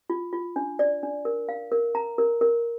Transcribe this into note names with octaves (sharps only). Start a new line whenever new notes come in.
F4
F4
D4
D5
D4
A#4
F5
A#4
A#5
A#4
A#4